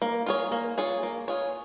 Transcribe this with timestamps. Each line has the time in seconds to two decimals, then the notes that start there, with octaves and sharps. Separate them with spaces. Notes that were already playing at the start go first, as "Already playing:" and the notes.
0.02 A#3
0.26 F4 G#4 C#5
0.52 A#3
0.78 F4 G#4 C#5
1.03 A#3
1.28 F4 G#4 C#5